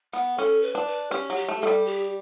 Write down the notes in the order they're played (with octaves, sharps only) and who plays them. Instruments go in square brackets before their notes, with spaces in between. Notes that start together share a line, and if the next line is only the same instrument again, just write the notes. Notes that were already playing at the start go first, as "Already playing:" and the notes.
[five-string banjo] B3 [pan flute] F#5
[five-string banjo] C#4 [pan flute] A4
[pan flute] B4
[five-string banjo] D4
[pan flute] B4
[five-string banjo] C#4 [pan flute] G4
[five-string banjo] F#3
[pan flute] G4
[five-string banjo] A3
[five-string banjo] A3 [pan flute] A4
[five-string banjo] G3
[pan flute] G4